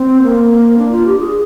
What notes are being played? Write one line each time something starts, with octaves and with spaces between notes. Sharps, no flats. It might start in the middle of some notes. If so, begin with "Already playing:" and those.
Already playing: C4
A#3
D4
F4
G4
G#4